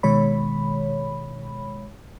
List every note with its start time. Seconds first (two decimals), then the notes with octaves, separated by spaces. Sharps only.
0.03 B2 D#3 G#3 C#5 B5